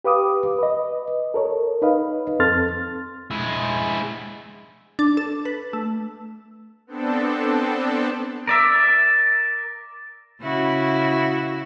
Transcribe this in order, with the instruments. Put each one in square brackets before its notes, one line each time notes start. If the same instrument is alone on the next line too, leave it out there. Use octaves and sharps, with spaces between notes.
[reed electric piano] G4 B4 F5 D6 D#6
B4 D#5
A4 A#4 C#5
D#4 B4 D#5 F5
F2 C4 A4 C6 F6 A6
[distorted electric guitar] G#3 E4
[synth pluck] D4
A4
B4
A3
[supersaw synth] B3 C4 D4 A4
[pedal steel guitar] A#4 D5 E5
[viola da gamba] C#3 E4 F#4